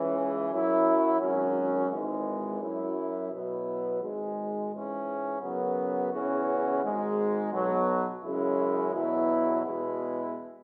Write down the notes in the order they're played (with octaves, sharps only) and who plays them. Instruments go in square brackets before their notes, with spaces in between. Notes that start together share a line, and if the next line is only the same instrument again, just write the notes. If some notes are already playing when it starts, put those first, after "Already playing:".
Already playing: [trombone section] C#2 C#3 E3
F#2 F#3 E4
G#1 F#2 F#3 C#4
G#1 G#2 E3 G#3
F#2 F#3 E4
B2 F#3 B3 E4
G#1 G#2 G#3
G#2 E3 C#4
F#2 C#3 F#3 B3
E2 C#3 E3 C#4 F#4
G#1 G#2 G#3
B1 B2 F#3
F#2 C#3 G#3 E4
E2 B2 F#3 E4
E2 B2 G#3 B3 E4